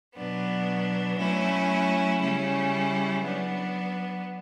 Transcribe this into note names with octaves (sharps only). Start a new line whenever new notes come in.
B2 F#3 B3 D4
F#3 A3 C#4 E4
C#3 G3 C#4 E4
F#3 B3 D4